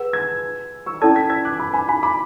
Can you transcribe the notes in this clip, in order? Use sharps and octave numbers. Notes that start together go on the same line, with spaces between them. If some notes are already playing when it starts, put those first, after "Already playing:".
Already playing: G#4 B4 F#5 E6
E6 G#6
C#6 E6
C#4 E4 A4 D5 A5 E6 G#6
G#6 B6
E6 G#6
D6 F#6
B5 D6
G#5 B5
G#5 B5
B5 D6